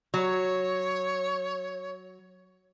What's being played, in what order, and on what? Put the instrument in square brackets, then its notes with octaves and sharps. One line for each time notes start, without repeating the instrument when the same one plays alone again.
[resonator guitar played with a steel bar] F#3 [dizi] C#5